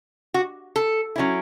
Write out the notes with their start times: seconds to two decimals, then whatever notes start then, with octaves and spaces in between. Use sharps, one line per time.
0.34 F#4
0.76 A4
1.16 F#3 C#4 E4